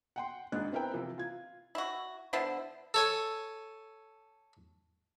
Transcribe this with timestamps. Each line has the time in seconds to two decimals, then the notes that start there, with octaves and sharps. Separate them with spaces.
0.16 F#5 G5 C6
0.52 G#1 G#2 D4 D#5 F#6
0.72 B3 C4 E4 A#4 B4 G5
0.93 C3 E3 F3
1.18 F4 G#6
1.75 E4 F#4
2.33 D3 B3 E4 C5
2.94 A4 C#5 G#5